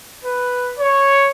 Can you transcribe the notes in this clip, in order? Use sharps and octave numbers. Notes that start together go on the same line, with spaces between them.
B4
C#5